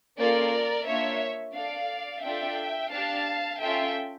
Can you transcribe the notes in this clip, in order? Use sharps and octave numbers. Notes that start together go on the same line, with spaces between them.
A#3 C#4 F4 A4 A#4 D5
A#3 D4 F4 C#5 E5
D4 A4 D5 F5
D4 F4 A4 E5 G5
D4 G4 F5 A5
C#4 F4 A4 E5 G5